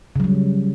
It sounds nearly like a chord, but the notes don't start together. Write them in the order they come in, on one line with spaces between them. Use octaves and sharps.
C#3 F#3 G3